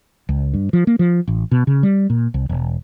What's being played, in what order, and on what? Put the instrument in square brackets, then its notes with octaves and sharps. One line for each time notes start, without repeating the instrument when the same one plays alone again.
[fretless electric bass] C#2
G2
F3
A#3
F3
A1
B2
C#3
G3
A#2
C2
E1